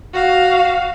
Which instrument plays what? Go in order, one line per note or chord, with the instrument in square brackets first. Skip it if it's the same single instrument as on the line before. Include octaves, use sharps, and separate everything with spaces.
[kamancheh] F#4 F5